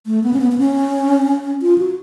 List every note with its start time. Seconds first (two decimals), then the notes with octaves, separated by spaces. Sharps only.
0.06 A3
0.24 B3
0.33 C#4
0.41 B3
0.52 B3
0.58 C#4
1.62 F4
1.78 F#4